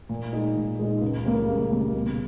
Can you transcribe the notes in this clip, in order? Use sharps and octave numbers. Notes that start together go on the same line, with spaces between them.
A#2
G#3 D#4
A#2
G#3 D#4
C#2
C#3 G3 A#3
C#2
C#3 G3 A#3
B2